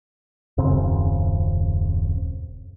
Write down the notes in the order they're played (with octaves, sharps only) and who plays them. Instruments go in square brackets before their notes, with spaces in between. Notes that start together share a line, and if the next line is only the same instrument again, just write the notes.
[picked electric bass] D#1 F#2 C#3 C4